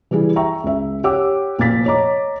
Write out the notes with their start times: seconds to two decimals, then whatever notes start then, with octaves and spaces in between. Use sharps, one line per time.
0.11 E3 G3 E4 G#4
0.36 E5 G5 A#5 C#6
0.64 C#2 E5
1.04 G4 C#5 F#5 G5 D6 E6
1.58 F1 A#2 F3 A6 B6
1.86 C#5 D#5 A#5 D6